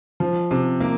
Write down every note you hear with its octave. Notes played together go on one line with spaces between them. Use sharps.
F3
C3
A#3